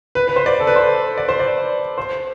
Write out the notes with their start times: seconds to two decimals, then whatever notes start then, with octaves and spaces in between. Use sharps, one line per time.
0.15 B4
0.28 B4
0.36 C5
0.46 D5
0.60 A4
0.67 B4
0.76 C5
1.18 D5
1.28 C5
1.40 D5
1.98 C5